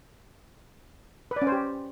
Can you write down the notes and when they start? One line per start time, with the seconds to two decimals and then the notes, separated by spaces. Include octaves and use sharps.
1.31 B4
1.36 D5
1.42 C#4
1.47 C5
1.52 G4